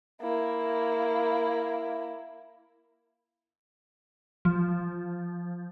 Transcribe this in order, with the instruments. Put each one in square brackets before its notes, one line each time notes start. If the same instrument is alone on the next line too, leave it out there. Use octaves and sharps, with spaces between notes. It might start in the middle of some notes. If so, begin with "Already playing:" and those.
[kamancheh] A#3 E4
[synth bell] F3